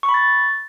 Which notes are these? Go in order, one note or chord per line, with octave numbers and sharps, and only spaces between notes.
C#6
B5
A6